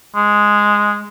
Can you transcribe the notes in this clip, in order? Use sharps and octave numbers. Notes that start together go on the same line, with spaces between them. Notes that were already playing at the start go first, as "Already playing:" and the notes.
G#3